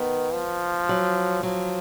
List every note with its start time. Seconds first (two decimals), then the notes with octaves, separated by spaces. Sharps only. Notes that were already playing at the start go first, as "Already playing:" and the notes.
Already playing: D#3 B3
0.33 F3
0.89 F#3
1.43 F3 F#3